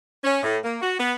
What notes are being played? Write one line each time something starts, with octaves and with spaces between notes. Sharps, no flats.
C#4
A2
A#3
F#4
B3